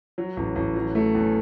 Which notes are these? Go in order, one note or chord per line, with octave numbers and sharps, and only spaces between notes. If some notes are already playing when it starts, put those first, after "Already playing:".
F#3
A1
A1
F#3
A3
E2